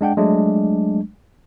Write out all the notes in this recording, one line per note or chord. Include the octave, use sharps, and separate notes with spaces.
G#3 D4 F#5 G5
F#3 G#3 A3 D4